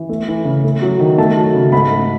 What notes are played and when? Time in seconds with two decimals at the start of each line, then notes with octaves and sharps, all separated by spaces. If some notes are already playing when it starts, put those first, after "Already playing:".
Already playing: E3
0.09 A3
0.28 E3
0.45 C#3
0.64 A3
0.82 F#3
1.00 D#3
1.18 A3 A5
1.37 F#3
1.55 C#3
1.72 G#2 B5
1.91 A3